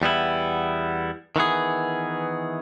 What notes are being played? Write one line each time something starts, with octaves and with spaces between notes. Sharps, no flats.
E2 G3 B3 E4
D#3 E3 B3 G#4